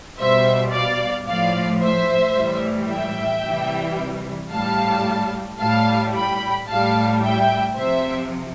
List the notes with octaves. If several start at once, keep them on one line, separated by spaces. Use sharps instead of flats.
B2 G3 C5 E5
D5 F5
A2 F3 D5 F5
C5 E5
A2 E3 G3
E5 G5
C3 E3 G3
A2 G3 F5 A5
A2 G3 F5 A5
G5 B5
A2 G3 F5 A5
E5 G5
C3 F3 C5 E5